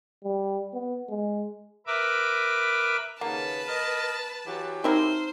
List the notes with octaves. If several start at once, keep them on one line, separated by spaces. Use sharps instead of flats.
G3
B3
G#3
A#4 B4 E5 D6
D#2 C#3 A#3 B4 F#5 A5
A#4 D#5
E3 F#3 G4
C4 D#4 E4 A#4 C5 G#5 E6